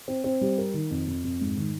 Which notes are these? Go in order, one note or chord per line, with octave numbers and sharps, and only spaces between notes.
C4
C4
G3
A#4
D#3
F2
F2
F2
G#2
D#3